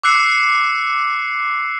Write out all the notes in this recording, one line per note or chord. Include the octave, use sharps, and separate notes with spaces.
D6 E6 F#6 C7 C#7